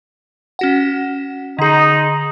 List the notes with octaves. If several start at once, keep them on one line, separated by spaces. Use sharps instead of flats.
C#4 F#4 F#5
D3 D#4 G#4